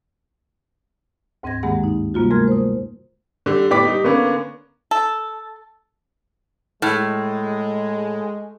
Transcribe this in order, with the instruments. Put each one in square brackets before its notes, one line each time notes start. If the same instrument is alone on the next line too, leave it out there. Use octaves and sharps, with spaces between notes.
[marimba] D2 G#2 C4 D#5 G#6 A#6
G2 D#3 G#3 A#3 G#4 F#5
D#4
C3 G3 A#3 F4 F#4
G#3 A3 A#4 C6 F6 G#6
C5 D#6
[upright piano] D3 G3
A2 B3 G4 D5 D6 B6
G3 D#4
D3 A#3 B3 C#4
[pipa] A4
[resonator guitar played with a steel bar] A2 [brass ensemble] G#3